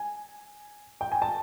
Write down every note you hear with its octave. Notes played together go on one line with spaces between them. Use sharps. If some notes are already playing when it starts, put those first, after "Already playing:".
Already playing: G#5
G5
G#5
A5